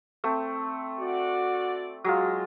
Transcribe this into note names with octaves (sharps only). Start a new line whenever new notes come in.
A3 C4
F#4 D5
F#3 G#3 F4